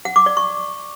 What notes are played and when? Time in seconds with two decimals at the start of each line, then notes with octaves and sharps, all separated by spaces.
0.05 F#5
0.16 D6
0.26 D5
0.37 C#6